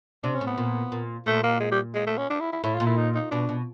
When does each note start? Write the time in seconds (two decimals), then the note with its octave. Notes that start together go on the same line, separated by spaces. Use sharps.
0.24 C3 D4
0.35 C#4
0.41 A2
0.47 B3
0.58 A#2
0.92 A#2
1.26 A#2 A3
1.43 A#3
1.60 G#3
1.72 G3
1.94 G#3
2.06 A3
2.18 C#4
2.30 D4
2.40 E4
2.52 E4
2.64 A2 E4
2.75 F4
2.80 A#2
2.86 E4
2.97 D#4
3.14 D#4
3.31 B2 D4
3.49 B2